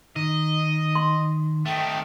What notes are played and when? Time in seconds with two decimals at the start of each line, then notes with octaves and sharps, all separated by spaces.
0.16 D#3 D#5
0.95 C6
1.66 D#3 A3 G5